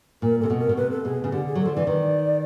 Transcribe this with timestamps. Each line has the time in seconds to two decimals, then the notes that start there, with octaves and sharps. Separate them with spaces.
0.22 A#2 A#4
0.41 C3 A4
0.50 B2
0.60 A#4
0.69 B2
0.77 C3 B4
0.91 A4
1.05 B2 G#4
1.24 C#3
1.32 D3 G4
1.46 G#4
1.55 F#3 A4
1.66 F3
1.74 E3 D5
1.87 D#3